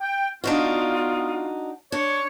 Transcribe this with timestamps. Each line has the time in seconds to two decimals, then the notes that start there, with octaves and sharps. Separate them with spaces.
0.01 G5
0.44 B3 D4 D#4 F4 F#4
1.92 D4 C#5